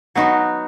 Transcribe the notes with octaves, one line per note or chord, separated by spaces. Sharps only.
F#3 B3 D#4 F#4